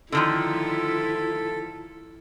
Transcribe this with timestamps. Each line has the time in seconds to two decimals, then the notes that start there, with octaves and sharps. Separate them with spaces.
0.12 D3 D#3 F3 E4 F4 A4